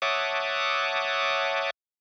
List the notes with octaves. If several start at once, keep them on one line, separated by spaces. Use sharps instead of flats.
C#5 E5 F#5 A5 D6 D#6